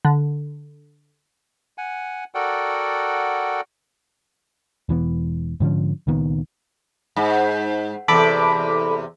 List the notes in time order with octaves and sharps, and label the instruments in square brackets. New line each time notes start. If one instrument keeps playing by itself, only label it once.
[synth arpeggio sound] D3
[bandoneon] F#5 G#5
F#4 A4 A#4 D5 F#5 G5
[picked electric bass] E1 E3 B3
G#2 D3 F3 C#4
C#2 A#2 D#3 B3
[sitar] G#2
[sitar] E2 C3 [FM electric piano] A4 B5 D6